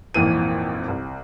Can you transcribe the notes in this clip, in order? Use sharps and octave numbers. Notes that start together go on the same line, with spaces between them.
G#1 F2 A#2 E3 D#7
C2